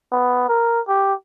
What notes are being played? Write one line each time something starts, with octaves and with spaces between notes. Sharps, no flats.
B3
A#4
G4